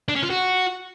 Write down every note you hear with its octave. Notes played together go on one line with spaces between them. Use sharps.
D4
C#4
F4
F#4